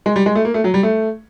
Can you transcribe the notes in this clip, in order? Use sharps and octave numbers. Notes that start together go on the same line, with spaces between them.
G#3
G3
G#3
A3
A#3
A3
F#3
G3
A3